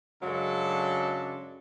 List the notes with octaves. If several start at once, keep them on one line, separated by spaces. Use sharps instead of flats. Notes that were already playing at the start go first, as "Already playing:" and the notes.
F#2 C#3 F#3 G#3 D4 A4